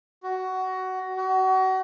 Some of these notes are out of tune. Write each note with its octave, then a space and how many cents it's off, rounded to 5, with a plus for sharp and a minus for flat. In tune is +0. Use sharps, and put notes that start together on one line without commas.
F#4 +15
F#4 +30